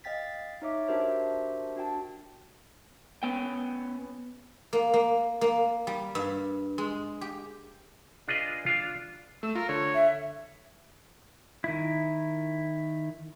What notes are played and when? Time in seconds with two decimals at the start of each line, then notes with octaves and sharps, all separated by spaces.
0.04 D#5 F5 G5 A6 B6
0.62 D#4 C#5 E5 D6
0.88 D4 F#4 G4 A#4 C5 E5
1.76 D4 F#4 G5 A5
3.23 B3 C#4 G5
4.73 A#3
4.94 A#3
5.41 A#3
5.87 G3
6.15 G2
6.78 G#3
7.21 G4
8.28 D4 F4 G#4 B4 D#5
8.66 D4 F4
9.43 A3 E6
9.55 F4 A#4
9.69 D3 C#5
9.95 E5
11.64 D#3 E4